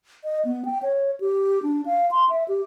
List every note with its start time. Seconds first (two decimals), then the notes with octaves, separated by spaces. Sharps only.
0.24 D#5
0.45 B3
0.65 G5
0.83 C#5
1.20 G4
1.63 D4
1.86 F5
2.11 C6
2.29 E5
2.48 G4